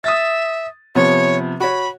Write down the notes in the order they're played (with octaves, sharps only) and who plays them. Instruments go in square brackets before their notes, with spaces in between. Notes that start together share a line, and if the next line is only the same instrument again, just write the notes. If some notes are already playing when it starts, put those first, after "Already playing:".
[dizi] E5 [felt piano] D#6 A6
[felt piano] C3 F3 B3 [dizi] C#5
[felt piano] F#4 C#5 [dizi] B5